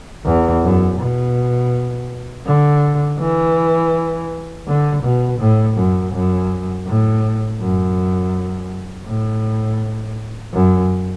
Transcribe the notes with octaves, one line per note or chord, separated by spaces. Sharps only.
E2
F#2
B2
D3
E3
D3
B2
A2
F#2
F#2
A2
F#2
A2
F#2